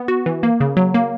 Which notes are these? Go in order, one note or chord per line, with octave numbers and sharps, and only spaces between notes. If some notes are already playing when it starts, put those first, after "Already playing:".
Already playing: B3
F#4
E3
A#3
C#3
F#3
A#3